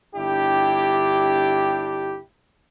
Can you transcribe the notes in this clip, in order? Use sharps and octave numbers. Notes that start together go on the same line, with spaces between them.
G1 D4 E4 G4